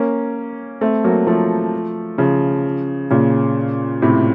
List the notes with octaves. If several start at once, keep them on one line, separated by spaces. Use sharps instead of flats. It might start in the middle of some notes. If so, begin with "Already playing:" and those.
Already playing: A#3 C#4
A3 C4
F#3 A#3
F3 A3
C#3 F3
A#2 C#3
A2 C3